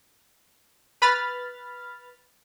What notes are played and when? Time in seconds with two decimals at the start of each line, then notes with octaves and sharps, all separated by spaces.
1.02 B4 B5 F6 A6